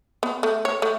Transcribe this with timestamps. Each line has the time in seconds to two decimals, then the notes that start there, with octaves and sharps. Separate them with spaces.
0.23 B3
0.43 A3
0.65 C#5
0.82 A3